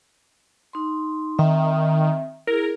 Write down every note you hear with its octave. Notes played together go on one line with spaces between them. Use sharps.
D#4 C6
D#3 C4 E5
E4 G#4 A#4